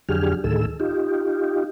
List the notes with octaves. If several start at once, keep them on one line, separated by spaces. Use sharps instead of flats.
F2 D3 F#3 G4 G#4 F6
D2 A2 D#3 G#4 A4 E6
D#4 F4 G4